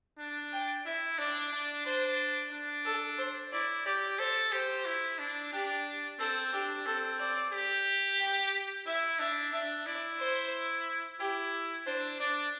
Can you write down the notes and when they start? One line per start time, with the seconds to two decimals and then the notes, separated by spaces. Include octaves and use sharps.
0.18 D4
0.52 G5
0.86 E4 E5
1.18 D4 D5
1.52 D4
1.85 D4 C5
2.52 D4
2.85 A4
3.19 C5
3.52 E4 D5
3.86 G4 D5
4.19 A4 C5
4.52 G4 C5
4.85 E4
5.19 D4
5.53 D4 G4
6.19 C4 A4
6.53 D4 G4
6.86 C4 A4
7.19 D5
7.52 G4
8.19 G5
8.86 E4 E5
9.19 D4 E5
9.52 D4 E5
9.86 E4 D5
10.19 C5
11.19 E4 G4
11.86 D4 C5
12.20 D4 D5